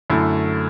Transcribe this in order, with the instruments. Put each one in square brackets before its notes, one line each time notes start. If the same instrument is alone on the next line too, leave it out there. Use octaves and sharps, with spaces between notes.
[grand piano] F#2 D3 A3 E4